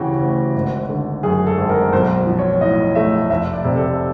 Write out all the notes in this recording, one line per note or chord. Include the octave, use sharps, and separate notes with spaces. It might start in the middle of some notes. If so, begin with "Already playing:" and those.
Already playing: D2 C#3 E3 F#4 G4
D2
G#1
D3
F#2 G#4
A4
G#1
A#4
B1 C5
F3
C#5
A2 D#5
A3 E5
F1 E5
D5
C3
A4